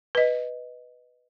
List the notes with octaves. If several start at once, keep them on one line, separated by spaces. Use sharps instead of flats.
B4 D#5